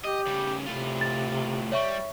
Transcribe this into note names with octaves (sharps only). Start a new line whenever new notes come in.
G4 D#5
C#3 G3
A2 C3 F4
A6
G3 C#5 E5 C#6